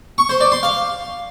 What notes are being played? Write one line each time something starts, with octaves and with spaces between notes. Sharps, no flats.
C#6
C5
D5
C6
F5